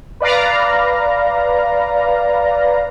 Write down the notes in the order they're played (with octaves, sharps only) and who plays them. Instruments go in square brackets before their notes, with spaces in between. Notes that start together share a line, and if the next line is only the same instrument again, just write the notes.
[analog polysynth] B4 D5 F5 A#5